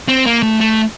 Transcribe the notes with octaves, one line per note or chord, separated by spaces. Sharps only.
C4
A#3
A3
A3